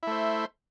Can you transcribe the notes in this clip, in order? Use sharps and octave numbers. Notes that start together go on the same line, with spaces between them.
A3 E4 C5